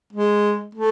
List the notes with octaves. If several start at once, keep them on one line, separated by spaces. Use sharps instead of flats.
G#3
A3